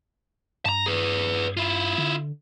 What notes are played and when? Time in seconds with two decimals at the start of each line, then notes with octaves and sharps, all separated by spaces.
0.66 G2 A5 A#5
0.86 G#4 B4
1.57 E4 F4
1.98 D3